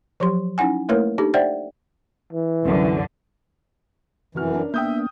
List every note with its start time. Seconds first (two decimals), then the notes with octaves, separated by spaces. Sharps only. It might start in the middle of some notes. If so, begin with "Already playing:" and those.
0.20 F3 F#3 G4 C6
0.58 C#4 D#4 E4 F#5 G#5
0.89 A3 A#3 E4 A#4 B4 C#5
1.18 D4 D#4 G4 A4
1.34 C5 D5 E5 F#5 G5
2.33 E3
2.63 C2 F#2 D3
4.35 F1 F#2 E3 F#4 F6
4.54 C#4 D4 A#4
4.74 A#3 B3 D4 E5 G5 D#6 G6